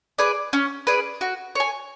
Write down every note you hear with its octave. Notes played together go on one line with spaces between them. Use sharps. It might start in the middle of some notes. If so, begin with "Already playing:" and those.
G#4 B4 D5
C#4
G#4 B4 D5
F#4
C#5 G#5